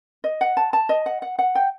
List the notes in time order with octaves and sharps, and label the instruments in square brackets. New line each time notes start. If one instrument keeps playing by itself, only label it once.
[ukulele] D#5
F#5
A5
A5
D#5
F#5
F#5
F#5
G5